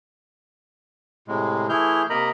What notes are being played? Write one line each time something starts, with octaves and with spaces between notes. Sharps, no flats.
A2 C3 G#3
E3 A3 E4 G#4 F6 G6
C3 A#3 A#4 D#5 A#5 B5